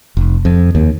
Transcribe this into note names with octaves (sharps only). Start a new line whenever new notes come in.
F1
F2
D#2